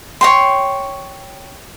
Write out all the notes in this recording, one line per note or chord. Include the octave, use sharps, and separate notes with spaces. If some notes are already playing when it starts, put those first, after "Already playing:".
C#5 G5 C6